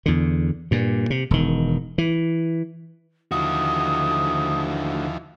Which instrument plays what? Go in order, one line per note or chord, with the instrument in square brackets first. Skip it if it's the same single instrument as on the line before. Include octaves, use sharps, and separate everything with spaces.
[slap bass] E2 D3
G2 A#2
C3
E1 D#3
E3
[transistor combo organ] D#2 E3 F3 [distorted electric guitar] D3 F#4 [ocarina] D#6